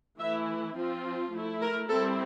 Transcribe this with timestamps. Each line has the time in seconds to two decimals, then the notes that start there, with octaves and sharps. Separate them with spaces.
0.19 E3 A3 E4 E5
0.76 F3 C4 F4
1.32 A3 E4
1.61 A#4
1.89 G3 C4 E4 A4